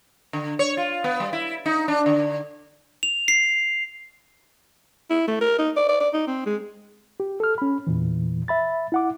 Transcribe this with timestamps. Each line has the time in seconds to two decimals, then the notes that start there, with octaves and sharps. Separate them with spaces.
0.33 D3
0.59 C#5
0.77 F4
1.04 B3
1.20 G3
1.33 E4
1.66 D#4
1.88 D4
2.06 D3
3.03 F7
3.28 C7
5.10 E4
5.28 A3
5.41 A#4
5.58 D#4
5.77 D5
5.89 D5
6.00 D5
6.14 D#4
6.27 C4
6.46 G#3
7.20 G4
7.40 A4 F6
7.58 C#4 B5
7.87 E2 A#2 E3
8.48 E5 B5 A6
8.92 E4 F#5 D6